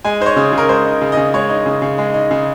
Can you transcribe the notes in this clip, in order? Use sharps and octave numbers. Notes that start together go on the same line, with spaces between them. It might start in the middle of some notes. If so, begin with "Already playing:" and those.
G#3 G#5
D#4 C5
C#5
C#3
C#3
A#4
G#3 C5
D#4
C#3
D#5
C#3
G#3 C#5
D#4
C#3
C#3
G#3
D#4
C#3